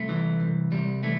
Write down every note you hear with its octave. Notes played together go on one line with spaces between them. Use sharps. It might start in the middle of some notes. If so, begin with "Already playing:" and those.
Already playing: C2 A3
E3
C2
C2 G3
E3 A3